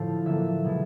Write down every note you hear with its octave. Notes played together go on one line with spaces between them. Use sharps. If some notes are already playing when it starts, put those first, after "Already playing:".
Already playing: A2 D3 F3 A3 F5
D3 F#3 A#3 E5
B2 G#3